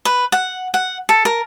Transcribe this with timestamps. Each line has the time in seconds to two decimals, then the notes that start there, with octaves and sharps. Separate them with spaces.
0.05 B4
0.32 F#5
0.74 F#5
1.09 A4
1.25 A#4